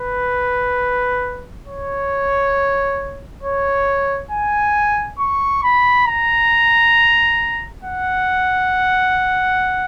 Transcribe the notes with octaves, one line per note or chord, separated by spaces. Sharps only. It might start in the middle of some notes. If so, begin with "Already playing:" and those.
Already playing: B4
C#5
C#5
G#5
C#6
B5
A#5
F#5